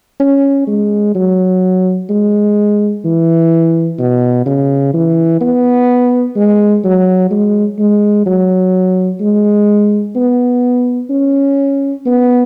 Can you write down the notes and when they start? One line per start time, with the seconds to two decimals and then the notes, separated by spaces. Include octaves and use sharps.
0.20 C#4
0.67 G#3
1.15 F#3
2.10 G#3
3.05 E3
3.99 B2
4.46 C#3
4.94 E3
5.41 B3
6.36 G#3
6.84 F#3
7.31 G#3
7.79 G#3
8.26 F#3
9.21 G#3
10.16 B3
11.10 C#4
12.06 B3